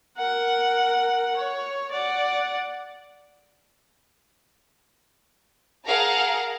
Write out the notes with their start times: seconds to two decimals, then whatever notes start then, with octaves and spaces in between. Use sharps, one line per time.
0.18 A#4 F#5
1.37 C#5
1.91 D5 F#5
5.86 G#4 A#4 F5 F#5 A5 A#5